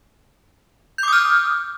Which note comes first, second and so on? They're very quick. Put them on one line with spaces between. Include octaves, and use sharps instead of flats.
G6 D6 D#6 F6